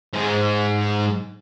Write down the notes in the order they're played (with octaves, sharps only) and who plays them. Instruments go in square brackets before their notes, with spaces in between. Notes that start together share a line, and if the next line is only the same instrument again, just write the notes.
[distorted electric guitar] G#2 G#3